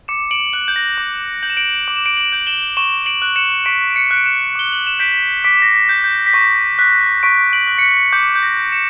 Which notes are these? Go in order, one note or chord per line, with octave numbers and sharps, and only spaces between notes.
D6 C#7 E7
D7 F#7
F#6 D7 F#7
G6
A#6
D6
G6 F#7
E7
D7 F#7
D6 F#7
E7
D7 F#7
D7 F#7
G6
E7 G7
C#6 E7 G7
D7 F#7
F#6
C#7 E7
C#6 B6 D7
D7
C#7 E7
F#6
D7
C#7 E7
D6 G7
F#7
E7
G6 B6 D7
D6 B6 D7
A#6
B6
G6
G6
B6
C#6 A#6
F#6 B6
C#6 B6 D7
D7 F#7
F#6
C#7
B6
D6 G6
G6
A#6
G6
C#7 E7